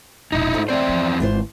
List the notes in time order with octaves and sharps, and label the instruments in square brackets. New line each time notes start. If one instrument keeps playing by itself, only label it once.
[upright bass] E1 A#1 [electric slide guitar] D#4 E4
[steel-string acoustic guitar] G#2 A3 [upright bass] F4
[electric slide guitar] E2 C4 C5 [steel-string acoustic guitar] D5 E5
[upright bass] F3
[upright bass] G#1 [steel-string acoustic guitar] E3 F4 C5